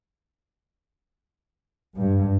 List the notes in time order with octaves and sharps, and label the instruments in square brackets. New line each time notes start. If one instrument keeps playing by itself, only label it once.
[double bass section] G2